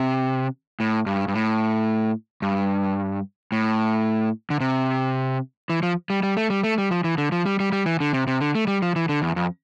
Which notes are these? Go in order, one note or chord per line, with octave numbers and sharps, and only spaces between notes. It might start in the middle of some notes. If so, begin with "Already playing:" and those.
Already playing: C3
A2
G2
G2
A2
G2
A2
D3
C3
E3
F3
G3
G3
A3
G3
A3
G3
F3
E3
D3
F3
G3
G3
G3
E3
D3
C3
C3
D3
A3
G3
F3
E3
D3
E2
F2